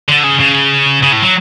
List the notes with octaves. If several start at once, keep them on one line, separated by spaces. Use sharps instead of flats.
D3
C#3
C#3
C#3
A2
F#3